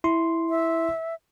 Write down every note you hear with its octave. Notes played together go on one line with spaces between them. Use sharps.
E4 C6
E5